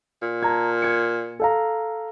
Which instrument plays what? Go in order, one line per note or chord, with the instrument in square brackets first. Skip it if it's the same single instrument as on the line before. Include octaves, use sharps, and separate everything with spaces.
[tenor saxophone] A#2
[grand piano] A5 A#5 G#6
G#6 C#7
A4 F5 A#5